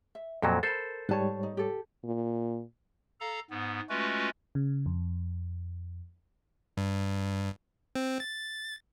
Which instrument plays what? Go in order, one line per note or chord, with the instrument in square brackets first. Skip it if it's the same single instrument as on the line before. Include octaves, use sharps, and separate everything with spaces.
[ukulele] E5
[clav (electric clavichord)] F2 A#2 F#3 [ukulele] A4 C5 F#5
[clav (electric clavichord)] A4 C5 [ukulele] A#4 B5
[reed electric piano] G#2 G3 C#5 [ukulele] B4 A5
[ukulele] D#4
G4 A4
[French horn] A#2
[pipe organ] A4 F5 A#5
G#2 B3
G#3 A3 C#4 F4 F#4 B4
[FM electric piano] C#3
F2
[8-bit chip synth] G2
C4
A6